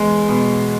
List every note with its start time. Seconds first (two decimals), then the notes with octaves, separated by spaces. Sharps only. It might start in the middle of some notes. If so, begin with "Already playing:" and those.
Already playing: E2 G#3
0.29 B2